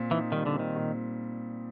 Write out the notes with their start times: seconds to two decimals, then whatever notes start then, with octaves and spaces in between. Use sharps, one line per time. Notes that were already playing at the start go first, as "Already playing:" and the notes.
Already playing: A#2 C4
0.10 E3 D#4
0.32 D#3 G3
0.46 D3
0.54 C4
0.59 D#3
0.76 A#2